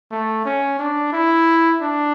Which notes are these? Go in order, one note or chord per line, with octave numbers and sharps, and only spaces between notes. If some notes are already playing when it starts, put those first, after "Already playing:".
A3
C#4
D4
E4
D4